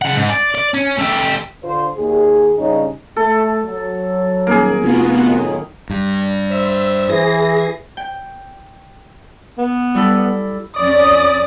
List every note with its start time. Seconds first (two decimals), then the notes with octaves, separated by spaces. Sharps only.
0.02 C#3 F#5
0.15 G#2
0.29 D5
0.55 D5
0.74 C#4
0.98 A3 G4
1.64 D3 F4 C5
1.97 D#2 G#4
2.58 G2 C#3 C#4 D#4
3.16 A3 A4
3.63 F#3
4.47 D#1 A#3 G#4
4.81 F1 B3 F4 F#4
5.24 F#2 A2 D#3
5.90 G2
6.51 C5 E5
7.10 E3 G#4 A#6
7.97 G5
9.58 B3
9.95 G3 E4 A4
10.76 F2 C#4 D5 D#6